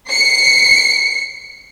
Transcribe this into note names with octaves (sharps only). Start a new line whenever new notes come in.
C7 C#7